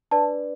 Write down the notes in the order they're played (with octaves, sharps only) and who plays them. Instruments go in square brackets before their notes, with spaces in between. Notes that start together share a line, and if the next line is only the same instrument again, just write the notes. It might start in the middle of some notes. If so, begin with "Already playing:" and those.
[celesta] D4 B4 D5 A5